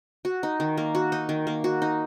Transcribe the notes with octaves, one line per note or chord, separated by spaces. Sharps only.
F#4
D#4
D#3
A#3
F#4
D#4
D#3
A#3
F#4
D#4